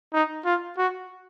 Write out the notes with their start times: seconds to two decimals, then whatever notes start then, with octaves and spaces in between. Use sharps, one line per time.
0.13 D#4
0.45 F4
0.78 F#4